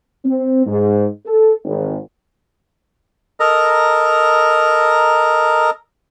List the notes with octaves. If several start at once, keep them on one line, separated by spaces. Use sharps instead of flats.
C4
G#2
A4
G#1
A4 A#4 D#5 A#5